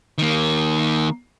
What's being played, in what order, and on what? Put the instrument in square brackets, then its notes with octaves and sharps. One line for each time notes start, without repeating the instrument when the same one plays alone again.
[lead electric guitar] D#3 A#3